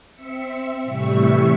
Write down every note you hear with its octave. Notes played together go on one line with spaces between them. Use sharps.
C4 E5 C#7
A2 C3 E3 G3 E5 C#6